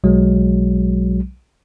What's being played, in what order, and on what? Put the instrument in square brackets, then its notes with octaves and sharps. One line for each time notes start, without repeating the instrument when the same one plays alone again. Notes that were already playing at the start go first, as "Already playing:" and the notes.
[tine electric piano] B1 F#3 G#3